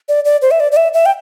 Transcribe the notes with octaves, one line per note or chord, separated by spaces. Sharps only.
D5
D5
C5
E5
D5
D5
E5
E5
G5